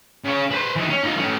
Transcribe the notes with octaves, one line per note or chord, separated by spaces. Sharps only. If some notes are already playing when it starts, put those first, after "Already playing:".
C#3 C#5
B4 C5
E3 D#4
C#4
D#4 F4
A3 C#4